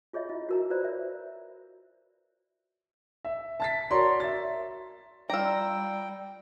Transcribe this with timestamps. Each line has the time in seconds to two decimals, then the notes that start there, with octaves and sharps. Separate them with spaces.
0.13 F4 G#4 C#5 D#5 E5
0.29 E4 F4 D#5
0.49 F#4 A#4 A#5
0.70 F4 B4 C5 D5 A#5
0.84 A#4 C#5 E5
3.25 E5
3.60 A5 A6 B6
3.91 F#4 A#4 C#5 D5 A#5 C6
4.20 E5 A6
5.30 G3 F4 D5 G5 A#5 E6